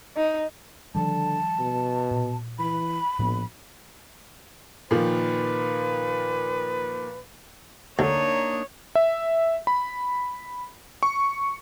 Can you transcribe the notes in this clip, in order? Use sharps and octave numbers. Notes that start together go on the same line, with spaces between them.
D#4
D3 D#3 F3 G3 A5
B2
A#2
E3 B5
A#1 A2 F3 B3
A#2 D#3 F3 B4
D2 A#3 D4 D#4 C#5
E5
B5
C#6